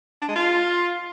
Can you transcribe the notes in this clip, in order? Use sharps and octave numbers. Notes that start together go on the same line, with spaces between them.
D4
G#3
F4